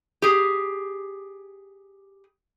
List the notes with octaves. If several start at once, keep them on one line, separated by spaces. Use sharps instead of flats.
G4 G#4